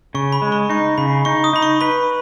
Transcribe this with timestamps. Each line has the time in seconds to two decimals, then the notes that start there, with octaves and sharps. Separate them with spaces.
0.14 C#3 C#6
0.32 B5
0.42 G#3
0.52 C#6
0.70 D#4 C#6
0.98 C#3 B5
1.25 D#4 C#6
1.44 D#6
1.53 D#4 B5
1.63 C#6
1.81 B4 B5